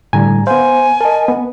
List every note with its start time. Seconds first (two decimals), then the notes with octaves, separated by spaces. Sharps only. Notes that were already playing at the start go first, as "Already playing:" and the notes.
0.13 A2 D3 G3 G#5 A#5
0.47 B3 C5 F5 G#5
1.01 A#4 D#5 A5
1.28 B3